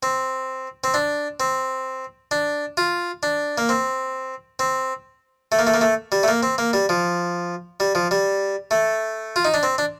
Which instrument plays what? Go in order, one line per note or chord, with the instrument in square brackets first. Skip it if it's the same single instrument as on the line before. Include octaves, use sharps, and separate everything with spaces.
[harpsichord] C4
C4
D4
C4
D4
F4
D4
A#3
C4
C4
A3
A#3
A3
A#3
A3
G3
A3
A#3
C4
A#3
G3
F3
G3
F3
G3
A3
F4
D#4
D4
C4
D4